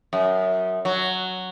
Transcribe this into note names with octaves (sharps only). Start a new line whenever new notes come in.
F#2
F#3